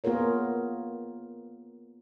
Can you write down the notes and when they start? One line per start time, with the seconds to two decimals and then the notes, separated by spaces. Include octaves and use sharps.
0.04 A#3 B3 F4 G#4 A#4 C#5